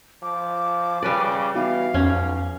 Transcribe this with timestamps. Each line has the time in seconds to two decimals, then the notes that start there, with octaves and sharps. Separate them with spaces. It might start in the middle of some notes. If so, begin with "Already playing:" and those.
0.22 F3 D6
1.03 C#3 G3 B4 D5
1.55 E3 B3 D#4 F#4 F5
1.94 B1 F2 C#4